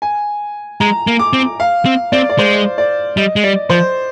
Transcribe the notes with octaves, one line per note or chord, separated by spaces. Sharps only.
G#5
G#3 A#5
A#3
D6
C4
F5
C4
C4 D5
D5
G#3 C5
D5
G3 D#5
G#3
G3 D5
F3 C5